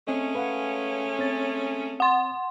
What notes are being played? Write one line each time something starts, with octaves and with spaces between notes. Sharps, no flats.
G#3 A3 C4 C#4 D#5
B4 F5 F#5
C4 C#5 A6
F#5 C6